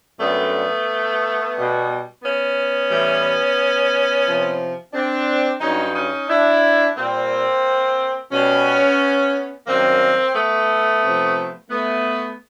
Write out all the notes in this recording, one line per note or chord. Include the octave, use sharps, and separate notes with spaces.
F#2 D3 G3 A3 B3
B2 G3
B3 C#4
A2 E3 G3
C3 F3
C4 D4
G2 D3 F#3 C#4 D#4
C#4 D#4
D4 E4
A#2 G3 A#3 C4
B2 G3 B3 C#4
F#2 D#3 G3 A#3 C4
A3 B3
C3 F3
A3 B3